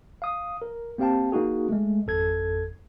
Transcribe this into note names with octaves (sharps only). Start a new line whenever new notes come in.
F5 D#6
A#4
A#3 C4 G4 F5 G5 A5
A#3 D#4 F#4 G#4
G#3 A3
G#1 F2 A4 G#6